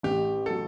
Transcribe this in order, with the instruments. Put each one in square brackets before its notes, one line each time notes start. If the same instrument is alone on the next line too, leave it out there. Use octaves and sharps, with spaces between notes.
[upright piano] A1 [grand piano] G4
[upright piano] F#3 [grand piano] A4